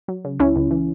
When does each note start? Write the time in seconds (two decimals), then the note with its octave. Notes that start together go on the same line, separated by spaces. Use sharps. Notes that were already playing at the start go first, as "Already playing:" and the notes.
0.08 F#3
0.25 C#3
0.40 C#2 C#4 E4
0.56 C#2
0.71 E3